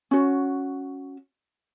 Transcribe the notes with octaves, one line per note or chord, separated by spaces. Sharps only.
C#4 F#4